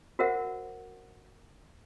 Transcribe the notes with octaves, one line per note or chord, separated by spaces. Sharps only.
F#4 A#4 C5 E5 F#5